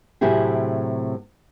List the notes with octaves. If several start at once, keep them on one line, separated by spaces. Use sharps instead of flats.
A2 C3 F#3 E4 G4 G#4